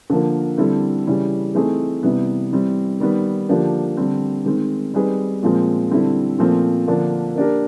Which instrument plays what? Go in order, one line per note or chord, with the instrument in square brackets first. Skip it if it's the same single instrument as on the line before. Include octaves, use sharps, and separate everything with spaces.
[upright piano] D3 F3 A#3
D3 G3 C4 E4 A4
C#3 E3 G3
E3 A3 C4 D#4 G#4
C3 E3 G3 B3
E3 G3 C4
D#3 G3 B3
D3 F3 A#3 D4 G4
D3 G3 C4
D#3 G#3 C4
G3 C4 D#4 G#4 B4
A#2 F3 G#3 C4
D3 G3 C4 E4 A4
A#2 F3 A3 C4
D3 F3 A#3 D4
A#3 D4 G4 A#4